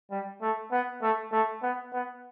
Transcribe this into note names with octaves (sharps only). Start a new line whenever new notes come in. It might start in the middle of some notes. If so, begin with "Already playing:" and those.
G3
A3
B3
A3
A3
B3
B3